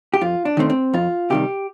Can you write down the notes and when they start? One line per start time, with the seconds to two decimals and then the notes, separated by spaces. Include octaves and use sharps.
0.14 G4
0.21 F2 F4
0.45 D4
0.57 D#3 A3 C4
0.70 C4
0.93 F2 F4
1.30 C3 D#3 G3 G4